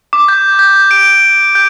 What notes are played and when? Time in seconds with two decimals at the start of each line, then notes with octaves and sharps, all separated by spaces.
0.13 D6
0.28 G6
0.59 G6
0.91 D7
1.55 G6